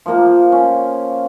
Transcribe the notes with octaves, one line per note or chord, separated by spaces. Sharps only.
F3 A#3
C#4